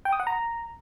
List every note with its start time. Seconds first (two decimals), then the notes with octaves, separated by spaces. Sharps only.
0.05 G5
0.12 D#6
0.20 F#5
0.27 A#5